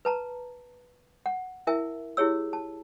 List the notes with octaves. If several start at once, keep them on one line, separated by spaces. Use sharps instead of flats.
B4 A5 A#5
F#5
E4 A#4 E5 G#5
E4 G4 G#4 C#5 E6
A5